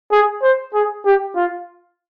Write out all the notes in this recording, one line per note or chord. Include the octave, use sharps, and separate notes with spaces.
G#4
C5
G#4
G4
F4